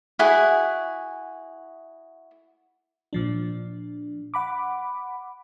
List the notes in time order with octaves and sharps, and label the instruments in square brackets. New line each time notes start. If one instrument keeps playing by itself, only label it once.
[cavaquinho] E4 F#4 G#4
[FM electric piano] A#2 F3 D4
F#5 B5 D6